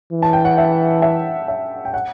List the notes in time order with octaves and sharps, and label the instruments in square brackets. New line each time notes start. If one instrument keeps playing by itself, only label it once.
[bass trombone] E3
[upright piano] A5
G5
F#5
E5
E5
E5
G5
F#5